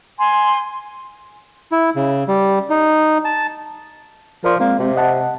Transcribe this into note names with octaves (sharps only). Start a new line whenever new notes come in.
G#5 C6
E4
C#3
G3
D#4
A5
F3 A#4 D5 C6
G#3 A#3 C4
C3
D#5 F#5 A5